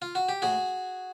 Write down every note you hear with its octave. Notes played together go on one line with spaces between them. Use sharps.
F4
F#4
G4
A2 F#4 G#4